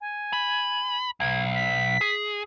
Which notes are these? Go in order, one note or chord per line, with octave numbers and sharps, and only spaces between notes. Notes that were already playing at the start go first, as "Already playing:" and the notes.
G#5
B5
B1 G#6
B6
G#4